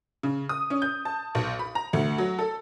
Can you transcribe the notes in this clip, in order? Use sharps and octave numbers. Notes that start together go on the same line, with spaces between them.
C#3
D#6
C#4
G6
A5
B1
B5
A#5
D2
F#3
A4